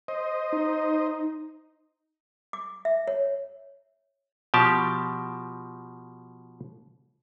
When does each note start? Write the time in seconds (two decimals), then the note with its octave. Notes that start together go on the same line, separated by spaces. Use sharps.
0.08 C5 D#5
0.53 D#4
2.53 D6
2.85 E5
3.07 C#5
4.54 B2 F3 G4 A5